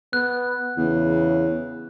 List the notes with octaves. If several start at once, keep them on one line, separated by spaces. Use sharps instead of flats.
B3 F#6
E2 C#3